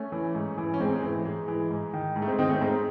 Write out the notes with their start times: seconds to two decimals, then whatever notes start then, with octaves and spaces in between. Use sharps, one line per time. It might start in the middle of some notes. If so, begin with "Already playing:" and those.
Already playing: A3 C#4
0.12 E3
0.35 G#2
0.58 E3
0.74 C#4
0.80 G#2 G#3 C4
0.95 G#3
1.02 E3 A3
1.25 G#2 G#3
1.48 E3
1.71 G#2
1.94 D#3
2.16 G#2
2.22 A3
2.27 G#3 C4
2.39 D#3 C4 D#4
2.49 A3 C#4
2.61 G#2 G#3 C4